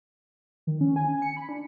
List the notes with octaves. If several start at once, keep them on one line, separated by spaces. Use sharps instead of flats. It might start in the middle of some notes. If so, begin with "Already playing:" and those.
D#3
C#4
G#5
G#5
C#7
B5
D4